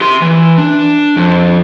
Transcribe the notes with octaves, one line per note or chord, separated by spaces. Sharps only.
G4 C6
E3
D4
F2